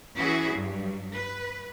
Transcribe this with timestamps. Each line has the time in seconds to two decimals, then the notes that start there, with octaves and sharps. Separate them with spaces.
0.16 E3 C#4 E4 F#4 G#4
0.54 G2 F#3
1.14 B4